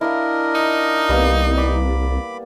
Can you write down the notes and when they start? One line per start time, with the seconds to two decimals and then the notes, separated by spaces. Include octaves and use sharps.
0.01 D4 E4 A#4 D#5 F5
0.55 D#4
1.09 C2 G3 A#3 B3
1.57 D5 B5 D6